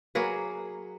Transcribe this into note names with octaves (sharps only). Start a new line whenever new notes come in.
F#3 A#3 G#4 B4